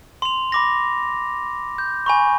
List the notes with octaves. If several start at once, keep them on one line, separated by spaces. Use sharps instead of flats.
C6 F7
B5 D6 A#6
G6
G#5 B5 C#6